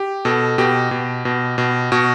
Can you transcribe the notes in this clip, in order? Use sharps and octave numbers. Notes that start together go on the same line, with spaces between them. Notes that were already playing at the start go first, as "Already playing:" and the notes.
Already playing: G4
B2 A4
B2 G4
B2
B2
B2
B2 F#4